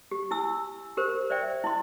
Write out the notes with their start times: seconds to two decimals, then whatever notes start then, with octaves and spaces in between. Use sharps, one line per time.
0.11 G4
0.31 E4 G#5 E6
0.97 G4 A#4 C5
1.30 C5 D5 E5 G5
1.64 E4 D#5 C6